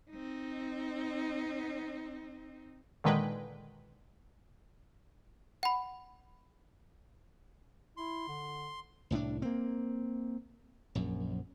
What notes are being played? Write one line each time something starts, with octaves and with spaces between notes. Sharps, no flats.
C4 D#4
A#2 D3 D#3 G#3 B4 G5
F#5 B5
E4 C6
D3
C2 A2 F#3 D4
A#3 C4
A#1 F#2